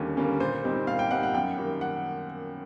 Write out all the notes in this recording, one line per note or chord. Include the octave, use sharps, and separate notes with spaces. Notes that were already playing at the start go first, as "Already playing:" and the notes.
Already playing: D#2 D3 G3 A#3 C#4
D3 G3 A#3 C#4
A#2 C5
G3 C4 D#4
A#2 F5
G5
G3 C4 D#4 F#5
F#5
F#2 G5
D#3 G3 A#3
F#5